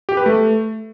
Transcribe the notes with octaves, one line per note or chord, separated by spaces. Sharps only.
G4
B4
A3